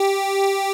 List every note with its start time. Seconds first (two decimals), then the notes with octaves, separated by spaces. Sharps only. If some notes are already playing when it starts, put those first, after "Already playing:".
Already playing: G4